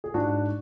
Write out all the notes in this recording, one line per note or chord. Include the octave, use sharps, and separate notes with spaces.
G#4
G#2 D4 F#4